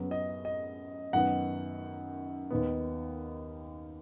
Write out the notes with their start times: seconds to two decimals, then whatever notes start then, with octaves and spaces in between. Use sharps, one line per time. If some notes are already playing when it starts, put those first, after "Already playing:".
Already playing: F#2 C#3 F#3 B3
0.11 D#5
0.45 D#5
1.13 F#2 D#3 B3 F#5
2.50 D#2 D#3 B3